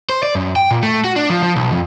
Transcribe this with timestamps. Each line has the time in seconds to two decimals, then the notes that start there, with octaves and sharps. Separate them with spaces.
0.09 C5
0.23 D5
0.35 F#2
0.56 G5
0.71 A#2
0.83 A3
1.04 F#4
1.16 D4
1.30 F3
1.42 F3
1.56 B1
1.72 F2